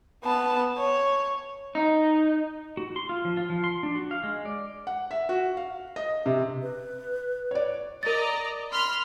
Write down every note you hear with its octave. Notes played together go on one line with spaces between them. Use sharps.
B3 A5
C#5
D#4
F#4
C6
F4
F3
F4
F3
C6
D4
F#4
F5
G#3
D5
F#5
E5
F#4
F5
D#5
C3
B4
C#5 D5
A#4 D5 D#5 A#5 A6
B5 C6 F6